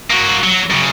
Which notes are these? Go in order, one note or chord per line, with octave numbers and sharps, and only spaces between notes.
A#3 F#4
F#3
F#2 C#3